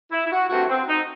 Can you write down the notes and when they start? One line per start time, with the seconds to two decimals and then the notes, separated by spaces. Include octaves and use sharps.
0.12 E4
0.26 E4
0.31 F#4
0.49 G2 E3 A3 C4 F#4
0.69 C4
0.88 D#4